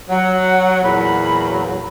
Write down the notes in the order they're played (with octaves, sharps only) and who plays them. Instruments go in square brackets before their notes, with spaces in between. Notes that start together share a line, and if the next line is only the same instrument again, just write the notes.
[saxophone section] F#3 [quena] F#5
[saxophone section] E2 A#2 F#3 [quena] B5